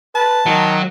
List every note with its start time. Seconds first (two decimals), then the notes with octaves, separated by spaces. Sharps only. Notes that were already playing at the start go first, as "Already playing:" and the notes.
0.15 B4 A5
0.46 D#3 F#3